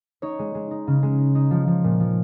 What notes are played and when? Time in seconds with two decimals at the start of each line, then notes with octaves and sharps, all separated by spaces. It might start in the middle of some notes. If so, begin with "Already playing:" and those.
0.22 D#4 C#5
0.39 G#3
0.55 G#3
0.71 D#4
0.87 C#3
1.03 G#3
1.19 D#4
1.35 D#4
1.51 F3
1.67 F3
1.84 A#2
2.00 F3